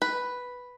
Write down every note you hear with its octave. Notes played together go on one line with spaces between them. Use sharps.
B4